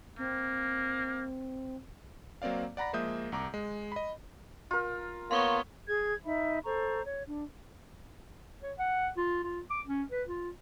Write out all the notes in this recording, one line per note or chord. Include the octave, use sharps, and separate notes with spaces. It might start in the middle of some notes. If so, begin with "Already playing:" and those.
A#3 C4
F#3 A#3 C4 D5 F5
D5 F#5 A#5 B5 A#6
F3 G#3 A#3 E5 D#6 G6
C2 A#5 D6
G#3
D#5 B5
F4 A#4
A#3 B3 C#5 C6 C#6 G7
G#4 G#6
D#4 E5 B5
A4 C5 A#5 C#6
C#5
D4
C#5
F#5
F4
F4
D6
C#4
B4
F4